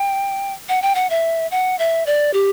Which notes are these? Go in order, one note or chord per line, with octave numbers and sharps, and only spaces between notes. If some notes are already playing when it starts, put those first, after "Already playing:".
Already playing: G5
F#5
G5
F#5
E5
F#5
E5
D5
G4